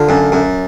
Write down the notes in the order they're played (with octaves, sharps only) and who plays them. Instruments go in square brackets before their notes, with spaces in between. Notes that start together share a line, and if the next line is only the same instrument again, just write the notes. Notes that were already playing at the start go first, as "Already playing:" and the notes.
Already playing: [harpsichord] D3 F4
F#2
F#2